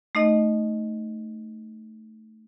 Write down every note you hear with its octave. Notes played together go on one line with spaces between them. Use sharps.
A3 D#4 D#5